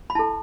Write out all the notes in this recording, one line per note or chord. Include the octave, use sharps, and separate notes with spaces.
B5
E4 A4 A5